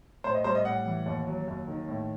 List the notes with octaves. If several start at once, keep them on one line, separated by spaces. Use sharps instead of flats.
A2 C5
D#5
G3 C5
D#5
A2 F#5
E3
D#2
F#3
D#2
D#3
A2